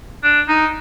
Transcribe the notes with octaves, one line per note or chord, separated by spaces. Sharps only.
D4
D#4